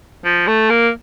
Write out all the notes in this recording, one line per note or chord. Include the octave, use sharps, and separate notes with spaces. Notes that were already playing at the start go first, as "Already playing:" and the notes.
F3
A3
A#3